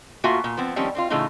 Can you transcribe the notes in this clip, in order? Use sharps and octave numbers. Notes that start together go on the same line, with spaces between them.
A2 A#3 F4 F#4 E5 G#5
A#2
F3 B3 C4
D#3 F3 G3 C4 C#4
C4 D4 F4
A2 C#3 E3 A3 D#4 F4